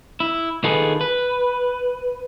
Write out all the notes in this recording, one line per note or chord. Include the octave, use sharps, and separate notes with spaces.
E4
D#3 D#4 F4 G#4 A4 B4
B4